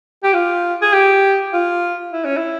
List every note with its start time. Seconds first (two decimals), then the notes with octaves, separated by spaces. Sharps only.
0.24 G4
0.33 F4
0.82 G#4
0.93 G4
1.53 F4
2.13 E4
2.25 C#4
2.37 E4